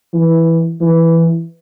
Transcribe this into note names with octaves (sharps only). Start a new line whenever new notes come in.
E3
E3